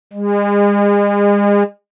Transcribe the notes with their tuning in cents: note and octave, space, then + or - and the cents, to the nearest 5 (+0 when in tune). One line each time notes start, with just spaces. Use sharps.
G#3 -40